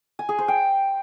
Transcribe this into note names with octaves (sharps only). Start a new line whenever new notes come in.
G#5
G#4
C5
G5